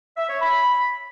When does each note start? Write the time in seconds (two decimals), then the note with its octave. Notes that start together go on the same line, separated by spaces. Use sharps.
0.17 E5
0.29 C#5
0.41 B5